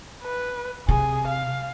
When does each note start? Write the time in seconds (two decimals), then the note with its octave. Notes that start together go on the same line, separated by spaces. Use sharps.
0.23 B4
0.89 C3 G#4
1.28 F5